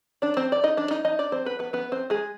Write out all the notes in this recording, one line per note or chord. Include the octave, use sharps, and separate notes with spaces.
D4 D5
C4 C5
D5
D#4 D#5
D4 D5
D#4 D#5
D#4 D#5
D4 D5
C4 C5
B3 B4
B3 B4
B3 B4
C4 C5
G#3 G#4